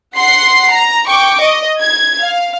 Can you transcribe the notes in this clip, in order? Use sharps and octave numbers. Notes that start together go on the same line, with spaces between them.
F#5 C6 C7
A#5
G5 C#6 D6
D#5
G#6
F5